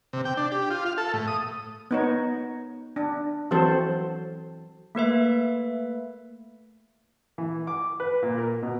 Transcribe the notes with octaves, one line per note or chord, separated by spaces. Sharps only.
C3
G5
D4
G4
F4
F5
A4
A2
D#6
B3 D#4 C#5
D4
E3 F#3 C4 A4 C5
A3 A#3 B4 E5
E3
D6
B4
A#2
A#4
B2